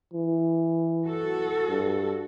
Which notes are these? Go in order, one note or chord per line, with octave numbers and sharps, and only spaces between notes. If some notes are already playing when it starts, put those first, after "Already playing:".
E3
F#4 A4
G2